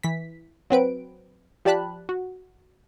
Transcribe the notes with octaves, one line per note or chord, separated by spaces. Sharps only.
E3 B6
F#3 C4 B4 D7
F3 G4 D5 A5 B5 F#6
F#4